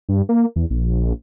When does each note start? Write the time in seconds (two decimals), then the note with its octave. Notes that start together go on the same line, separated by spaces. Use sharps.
0.09 G2
0.29 A#3
0.56 E2
0.70 A#1